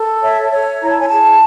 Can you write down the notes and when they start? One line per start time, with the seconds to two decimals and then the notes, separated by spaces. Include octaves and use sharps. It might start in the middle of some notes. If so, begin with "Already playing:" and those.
Already playing: A4
0.22 C#5 E5
0.52 C#5
0.82 E4 A#5
0.90 A5
0.99 G#5
1.09 G#4 A5